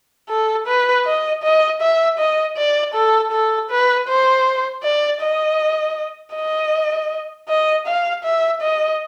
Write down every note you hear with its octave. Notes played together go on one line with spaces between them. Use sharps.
A4
B4
D#5
D#5
E5
D#5
D5
A4
A4
B4
C5
D5
D#5
D#5
D#5
F5
E5
D#5